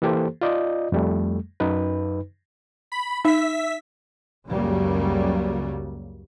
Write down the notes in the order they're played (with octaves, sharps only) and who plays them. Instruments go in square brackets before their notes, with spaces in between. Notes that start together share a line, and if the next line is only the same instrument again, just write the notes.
[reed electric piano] E3 A#3 G4 A4 C5
F4 D5 D#5
F2 G3 A3
F#2 D#4 B4
[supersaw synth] B5
[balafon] D#4 [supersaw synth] E5 B6
[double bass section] C#2 F#2 C#3 F#3 G3 A#3